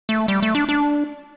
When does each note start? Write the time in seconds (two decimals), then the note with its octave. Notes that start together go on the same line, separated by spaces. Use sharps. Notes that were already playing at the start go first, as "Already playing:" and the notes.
0.09 A3
0.28 G3
0.42 A3
0.55 D4
0.69 D4